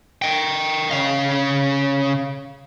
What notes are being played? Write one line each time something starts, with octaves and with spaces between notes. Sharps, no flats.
D#5 G5
C#3 F5